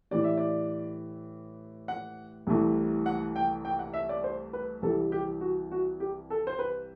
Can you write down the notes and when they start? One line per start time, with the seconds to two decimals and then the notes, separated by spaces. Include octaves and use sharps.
0.11 A2 E3 G3 D5
0.24 E5
0.37 D5
1.88 F#5
2.47 C2 C3 E3 A3
3.06 F#5
3.36 G5
3.65 G5
3.79 F#5
3.94 E5
4.09 D5
4.24 C5
4.53 B4
4.82 C2 C3 E3 G3 A4
5.12 G4
5.41 F#4
5.71 F#4
6.00 G4
6.30 A4
6.47 C5
6.59 B4